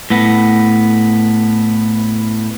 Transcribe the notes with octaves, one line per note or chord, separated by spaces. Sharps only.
A2 B3